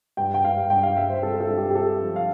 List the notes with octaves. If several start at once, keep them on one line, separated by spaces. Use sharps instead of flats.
G2 G5
G5
G2 F5
G2 G5
F5
G2 E5
C5
C4 A4
A4
G2
G4
G4
C4 A4
F3
F5